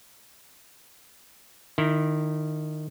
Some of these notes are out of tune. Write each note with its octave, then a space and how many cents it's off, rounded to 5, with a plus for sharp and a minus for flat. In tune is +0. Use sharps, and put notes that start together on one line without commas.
D#3 -25 E4 +0